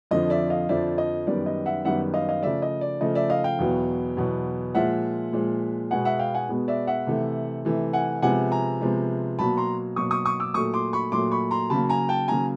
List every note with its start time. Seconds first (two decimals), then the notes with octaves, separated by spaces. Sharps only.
0.11 F2 D3 F3 D#5
0.30 D5 E5
0.50 D#5 F5
0.69 F2 D3 F3 D5 E5
0.98 D#5
1.27 F#2 D#3 G3 B3 D5
1.46 D#5
1.66 E5 F#5
1.85 F#2 D#3 G3 B3 E5 F#5
2.14 D#5 F5
2.29 D#5 F5
2.43 C#3 F3 A3 D5 E5
2.62 D#5
2.81 D5
3.01 C#3 F3 A3 D#5
3.15 D5 E5
3.30 D#5 F5
3.44 F5 G5
3.59 E2 B2 F#3 B3
4.17 E2 B2 F#3 B3
4.75 A#2 F3 G#3 E5 F#5
5.33 A#2 F3 G#3
5.91 B2 G#3 B3 F#5 G#5
6.05 E5 F#5
6.19 F5 G5
6.34 F#5 G#5
6.49 B2 G#3 B3
6.68 D5 E5
6.87 E5 F#5
7.07 C3 E3 A3
7.65 C3 E3 A3
7.93 F#5 G#5
8.22 C3 F3 G#3 B3 F#5 G#5
8.51 G#5 A#5
8.81 C3 F3 G#3 B3
9.39 B2 F#3 A#3 A5 B5
9.57 A#5 C6
9.96 B2 F#3 A#3 C#6 D#6
10.11 C#6 D#6
10.25 C#6 D#6
10.40 D6 E6
10.54 A#2 F#3 A3 C#6 D#6
10.74 C6 D6
10.93 B5 C#6
11.12 A#2 F#3 A3 C6 D6
11.31 B5 C#6
11.51 A#5 C6
11.70 C#3 F#3 A#3 A5 B5
11.89 G#5 A#5
12.09 G5 A5
12.28 C#3 F#3 A#3 G#5 A#5